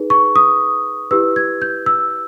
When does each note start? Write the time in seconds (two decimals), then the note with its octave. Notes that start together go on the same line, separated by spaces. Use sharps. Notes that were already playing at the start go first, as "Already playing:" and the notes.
Already playing: D#4 G#4 B4
0.10 C#6
0.36 D#6
1.11 E4 G4 B4 E6
1.36 G#6
1.62 G6
1.86 E6